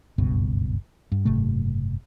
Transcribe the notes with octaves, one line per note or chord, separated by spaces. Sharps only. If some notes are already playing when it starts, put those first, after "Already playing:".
F#1 C#2 G2 B2
G2
F#1 G#2 C3 A3